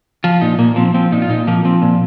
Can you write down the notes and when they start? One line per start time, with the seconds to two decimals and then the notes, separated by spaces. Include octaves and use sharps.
0.24 F3 F4
0.41 A#2 D#4
0.59 A#2 A#3
0.76 F3 C4
0.94 F3 C4
1.12 A#2 D#4
1.22 F4
1.29 A#2 D#4
1.47 F3 A#3
1.65 F3 C4
1.82 A#2